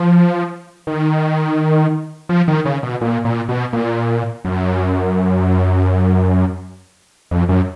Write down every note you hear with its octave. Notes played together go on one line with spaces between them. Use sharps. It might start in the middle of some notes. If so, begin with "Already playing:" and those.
Already playing: F3
D#3
F3
D#3
C#3
B2
A#2
A#2
B2
A#2
F#2
F2
F#2